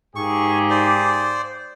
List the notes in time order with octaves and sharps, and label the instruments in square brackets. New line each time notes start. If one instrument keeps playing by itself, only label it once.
[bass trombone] G#2 [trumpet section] A#3 G4 G#4 [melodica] C#6
[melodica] C5 D5